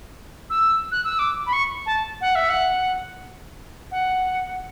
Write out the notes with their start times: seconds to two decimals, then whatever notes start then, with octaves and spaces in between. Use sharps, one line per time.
0.50 E6
0.92 F#6
1.04 E6
1.19 D6
1.47 B5
1.53 C#6
1.86 A5
2.21 F#5
2.35 E5
2.49 F#5
3.91 F#5